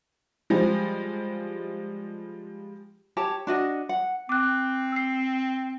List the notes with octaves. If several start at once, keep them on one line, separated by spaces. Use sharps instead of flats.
F3 G3 G#3
G4 C#5 A5
D4 F#4 D#5
F#5
C4 D6 F#6
E6 C7